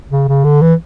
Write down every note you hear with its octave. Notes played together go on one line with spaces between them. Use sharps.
C#3
C#3
D3
E3